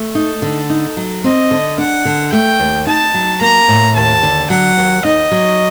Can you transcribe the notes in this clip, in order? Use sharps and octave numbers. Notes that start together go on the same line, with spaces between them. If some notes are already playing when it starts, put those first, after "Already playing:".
Already playing: A3
D#4 A4
D3
D#4
F#3
C4 D#5
D3
D4 F#5
D3
A3 G5
D#2
D#4 A5
F#3
A#3 A#5
A2
D#2 A5
D3
F#3 F#5
D#2
D#4 D#5
F#3